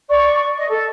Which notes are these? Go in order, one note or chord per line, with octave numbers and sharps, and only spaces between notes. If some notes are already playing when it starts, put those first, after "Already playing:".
D5 C#6
D#5
A4